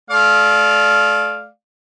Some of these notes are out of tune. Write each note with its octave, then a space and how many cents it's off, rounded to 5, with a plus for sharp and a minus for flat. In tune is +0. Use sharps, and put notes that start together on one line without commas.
A3 -40 D5 +0 F5 +0